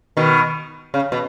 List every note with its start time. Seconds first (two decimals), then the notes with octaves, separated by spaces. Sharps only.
0.17 B2 D#3
0.94 C#3
1.12 B2